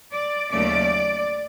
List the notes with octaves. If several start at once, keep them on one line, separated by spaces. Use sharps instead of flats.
D5
D#2 C#3 F#3 A3 D5